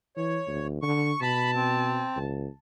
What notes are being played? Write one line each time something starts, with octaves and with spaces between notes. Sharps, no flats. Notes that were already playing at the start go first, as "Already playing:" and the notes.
E3 C#5
D2
D3 C#6
B2 A5 B5
C4
C#2